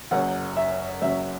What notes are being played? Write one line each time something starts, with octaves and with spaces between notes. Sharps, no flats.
F#1 F#2 F#3 F#5
E5
F#1 F#2 F#3 E5